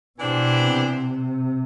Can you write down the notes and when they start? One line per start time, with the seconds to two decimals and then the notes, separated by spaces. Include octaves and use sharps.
0.18 B2 E3 B3 D4 G4 C5
0.65 C3